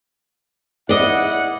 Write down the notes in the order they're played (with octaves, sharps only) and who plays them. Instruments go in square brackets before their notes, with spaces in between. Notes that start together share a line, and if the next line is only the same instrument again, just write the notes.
[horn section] E4 F#5 [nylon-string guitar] D5 D#5